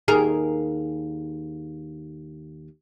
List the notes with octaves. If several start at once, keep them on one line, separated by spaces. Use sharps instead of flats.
D#2 G#4 A#4